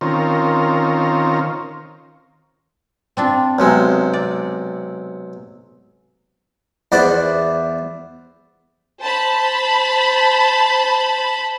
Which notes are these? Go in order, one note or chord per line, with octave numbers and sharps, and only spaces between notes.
D#3 C4 C#4 F4 A#4
C4 D4 F4
B1 C3 G#3
D5
E2 C5 D5 F#5
C5 A5 B5